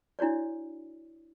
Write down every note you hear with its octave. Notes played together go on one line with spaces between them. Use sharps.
D4 E4 F#4 C#5 D5